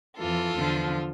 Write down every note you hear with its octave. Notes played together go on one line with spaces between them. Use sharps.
F2 E3 F4 A4
E2 D3 F3